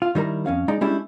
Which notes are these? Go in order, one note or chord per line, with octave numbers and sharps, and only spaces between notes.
F4
D#3 G3 E4 A#4 A#5
F2 C#4 F5
G#3 D#4 D5 A#5
G3 G#3 C#4 D4 E4 G4